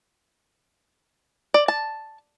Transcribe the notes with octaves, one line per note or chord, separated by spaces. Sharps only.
D5
A5